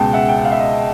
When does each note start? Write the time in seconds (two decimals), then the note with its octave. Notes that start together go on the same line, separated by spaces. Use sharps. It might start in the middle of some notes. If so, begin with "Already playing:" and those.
Already playing: C#2 B2 G#3 G5 A5
0.13 E5 F#5
0.29 G5
0.37 F#5
0.45 F5
0.52 E5
0.59 D#5